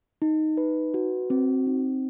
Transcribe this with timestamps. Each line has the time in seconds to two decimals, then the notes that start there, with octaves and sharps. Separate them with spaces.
0.22 D#4
0.57 B4
0.94 F#4
1.30 C4
1.67 D#4